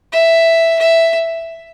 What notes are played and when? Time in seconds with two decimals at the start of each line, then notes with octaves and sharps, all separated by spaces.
0.12 E5
0.79 E5